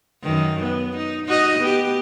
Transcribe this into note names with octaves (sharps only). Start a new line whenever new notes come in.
F#2 D#3
B3
D#4
D#4 F#4 D#5
B3 G4